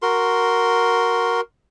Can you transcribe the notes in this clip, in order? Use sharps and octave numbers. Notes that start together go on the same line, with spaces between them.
F#4 A#4 C6